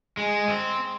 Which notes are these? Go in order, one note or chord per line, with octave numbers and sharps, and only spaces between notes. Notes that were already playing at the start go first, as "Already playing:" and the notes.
G#3
C4